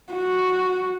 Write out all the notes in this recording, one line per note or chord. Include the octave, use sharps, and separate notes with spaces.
F#4